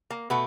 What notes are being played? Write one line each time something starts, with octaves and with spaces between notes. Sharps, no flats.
A#3
B2 A3 B3